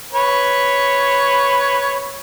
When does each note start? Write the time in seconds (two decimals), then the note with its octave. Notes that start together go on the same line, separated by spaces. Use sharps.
0.13 B4 C#5